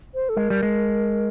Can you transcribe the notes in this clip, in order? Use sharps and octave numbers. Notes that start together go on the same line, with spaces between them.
C5
A4
G#3 A#4
G3
G#3